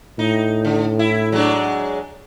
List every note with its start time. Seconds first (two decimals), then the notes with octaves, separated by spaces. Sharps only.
0.19 A2 D#4
0.65 D3
0.99 E4
1.32 F#3 G#3 D4